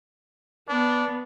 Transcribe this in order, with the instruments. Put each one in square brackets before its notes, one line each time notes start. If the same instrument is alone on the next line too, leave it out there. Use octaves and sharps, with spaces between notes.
[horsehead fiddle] B3 [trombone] D4